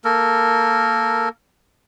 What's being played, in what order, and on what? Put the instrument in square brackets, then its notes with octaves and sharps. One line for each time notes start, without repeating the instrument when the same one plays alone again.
[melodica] A#3 A4 A#4